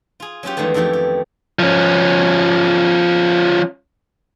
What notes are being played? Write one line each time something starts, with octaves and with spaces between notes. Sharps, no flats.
F4 G#4
F#3 C#4 F4 G4
E2 D#3 G#3 A3 B3
F2 D#3 E3 A3 B3 G4
G4
F3 C#4